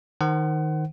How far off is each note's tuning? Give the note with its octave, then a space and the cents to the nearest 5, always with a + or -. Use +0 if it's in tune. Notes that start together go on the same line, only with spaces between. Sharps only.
D#3 +0 C5 +0 F#5 +30